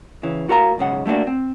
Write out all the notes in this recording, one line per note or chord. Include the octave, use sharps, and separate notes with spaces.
C#3 E3
A2 F#4 A#4 F5 A#5
B1 G#2 C#3 F#5
G3 A3 A#3 D4 F#4
C4